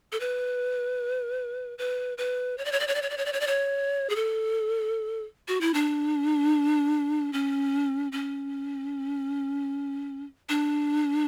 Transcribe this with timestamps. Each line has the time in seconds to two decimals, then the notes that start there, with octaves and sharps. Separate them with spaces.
0.12 A4
0.20 B4
1.78 B4
2.18 B4
2.58 C#5
2.65 D5
2.72 C#5
2.80 D5
2.87 C#5
2.95 D5
3.02 C#5
3.10 D5
3.17 C#5
3.26 D5
3.33 C#5
3.40 D5
3.47 C#5
4.10 G#4
4.16 A4
5.48 F#4
5.61 E4
5.74 D4
7.33 C#4
8.12 C#4
10.49 D4